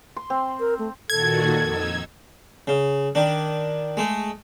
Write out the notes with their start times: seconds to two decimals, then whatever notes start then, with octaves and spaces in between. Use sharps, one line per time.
0.17 C6
0.30 C4
0.60 A#4
0.79 A3
1.10 A#2 D#3 F#4 A4 G#6
1.59 F2 D#4 E6
2.67 C#3
3.15 D#3 D4
3.97 G#3 A3